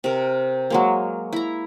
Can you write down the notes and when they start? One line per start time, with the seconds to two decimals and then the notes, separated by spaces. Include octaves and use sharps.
0.04 C3 A#4
0.70 F#3 G#3 A#3
1.33 E4 A#5